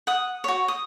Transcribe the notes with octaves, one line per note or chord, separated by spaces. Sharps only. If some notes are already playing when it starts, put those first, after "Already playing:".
F#5 D#6
F#4 C#5
D#6